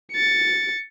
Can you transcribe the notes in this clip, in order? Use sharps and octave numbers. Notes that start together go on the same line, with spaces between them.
A6 C#7